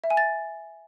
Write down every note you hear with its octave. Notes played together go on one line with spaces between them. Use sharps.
E5
G#5
A6